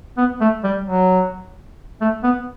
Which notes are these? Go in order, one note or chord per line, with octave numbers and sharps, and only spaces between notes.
B3
A3
G3
F#3
A3
B3